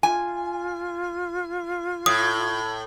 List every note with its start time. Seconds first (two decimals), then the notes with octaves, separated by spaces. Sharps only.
0.03 F4 G#5
2.06 A2 D#6